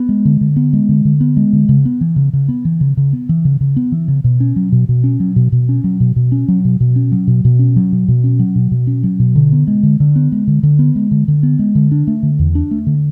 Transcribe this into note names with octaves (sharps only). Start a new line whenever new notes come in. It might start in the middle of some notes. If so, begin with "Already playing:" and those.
Already playing: B3
G#3
D3
D3
B3
G#3
D3
D3
B3
G#3
D3
C#3
B3
E3
C#3
C#3
B3
E3
C#3
C#3
B3
E3
C#3
C#3
B3
E3
C#3
B2
C#4
F#3
B2
B2
C#4
F#3
B2
B2
C#4
F#3
B2
B2
C#4
F#3
B2
B2
C#4
F#3
B2
B2
C#4
F#3
B2
B2
C#4
F#3
B2
B2
C#4
F#3
B2
D3
B3
G#3
D3
D3
B3
G#3
D3
D3
B3
G#3
D3
D3
B3
G#3
D3
D4
A3
D3
E2
D4
A3
D3